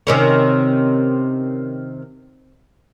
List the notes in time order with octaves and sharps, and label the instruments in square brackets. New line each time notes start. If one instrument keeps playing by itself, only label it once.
[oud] C3 D#3 C#4